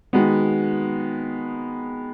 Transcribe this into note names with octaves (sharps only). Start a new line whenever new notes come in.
D#3 G#3 B3 F#4